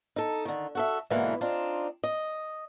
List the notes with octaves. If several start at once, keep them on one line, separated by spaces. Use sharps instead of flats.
D#4 A4
D3 D#3
F#4 A4 E5
G#2 B2 D3 E3 A#3
C4 D4 D#4 F4
D#5